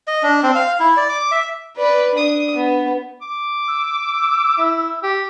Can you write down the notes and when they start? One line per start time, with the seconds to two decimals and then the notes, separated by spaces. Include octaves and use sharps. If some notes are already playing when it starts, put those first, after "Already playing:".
0.07 D#5
0.23 D4
0.43 C4
0.55 F5
0.80 E4
0.97 D5
1.09 D6
1.32 E5
1.77 B4 D5
2.15 D4 D#6
2.56 B3
3.21 D6
3.68 E6
4.58 E4
5.03 G4